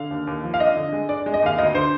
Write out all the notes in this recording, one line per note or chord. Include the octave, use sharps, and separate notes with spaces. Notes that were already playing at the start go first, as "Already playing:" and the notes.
Already playing: D3 F5
D#2
D#2
F3
F5
D4 D#5
D3
G#3
D4 D5
G#3
D#5
D#2 F5
D2 D#5
D3 C5